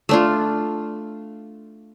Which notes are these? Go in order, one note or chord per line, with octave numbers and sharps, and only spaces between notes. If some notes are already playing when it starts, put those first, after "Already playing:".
A3 D4 F4